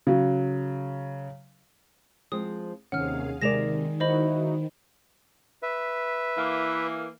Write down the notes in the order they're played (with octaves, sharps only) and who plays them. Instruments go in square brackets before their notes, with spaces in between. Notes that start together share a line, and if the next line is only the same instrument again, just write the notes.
[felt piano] C#3 F#3
[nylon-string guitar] F3 G#3 C4 [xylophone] D#6
[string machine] D#2 G#4 F5 [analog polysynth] C3 D#3 [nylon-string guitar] C#4 [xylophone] F#5 F6
[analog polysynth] C3 [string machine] D#3 [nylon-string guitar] G#3 A#4 D5 [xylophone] A#6 E7 F7
[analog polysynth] D#4 E4 F#4 [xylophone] C5 D#5 B5
[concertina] B4 E5
[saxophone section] E3 A#3